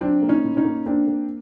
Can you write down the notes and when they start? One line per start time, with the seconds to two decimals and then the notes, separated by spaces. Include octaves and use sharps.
0.01 F#3 C4 D4
0.22 A#3
0.29 C#4 D#4
0.44 A2
0.57 C#4 D#4
0.64 A#3
0.86 A#3 C4 D4
1.07 A#3